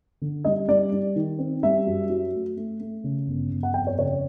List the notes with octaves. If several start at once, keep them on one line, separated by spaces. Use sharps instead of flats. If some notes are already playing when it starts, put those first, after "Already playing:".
D3
G3 D#5
G3 D5
G3
D#3
C4
G3 E5
F#2
F#3
A3
A3
A3
C#3
G1
G1
F#5
F2 G5
C#5
C#3 C#5